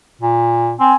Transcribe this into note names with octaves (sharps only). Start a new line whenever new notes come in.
A#2
C4 G#5